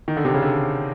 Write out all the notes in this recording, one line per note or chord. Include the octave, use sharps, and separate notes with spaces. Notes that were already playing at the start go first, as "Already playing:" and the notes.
D#3
D3
C3
C#3
D3